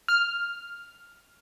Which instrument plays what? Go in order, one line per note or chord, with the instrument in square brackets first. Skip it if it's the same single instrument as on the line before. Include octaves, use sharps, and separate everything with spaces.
[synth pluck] F6